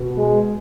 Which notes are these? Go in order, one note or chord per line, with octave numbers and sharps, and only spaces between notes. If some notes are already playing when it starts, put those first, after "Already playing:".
Already playing: B2
G#3